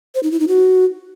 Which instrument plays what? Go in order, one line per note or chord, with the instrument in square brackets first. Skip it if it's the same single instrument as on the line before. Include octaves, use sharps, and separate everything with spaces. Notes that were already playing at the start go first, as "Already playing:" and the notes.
[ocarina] C5
D#4
E4
D#4
F#4